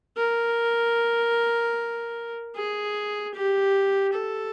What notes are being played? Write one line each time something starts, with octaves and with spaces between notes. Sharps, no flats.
A#4
G#4
G4
A4